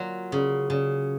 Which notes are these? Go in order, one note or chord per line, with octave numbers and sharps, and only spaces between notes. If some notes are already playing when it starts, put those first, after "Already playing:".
Already playing: F#3 A#3 F4
C#3
C#3